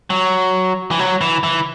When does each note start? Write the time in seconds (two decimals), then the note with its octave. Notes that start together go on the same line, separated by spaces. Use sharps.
0.10 F#3
0.91 E3
0.99 F#3
1.21 E3
1.44 E3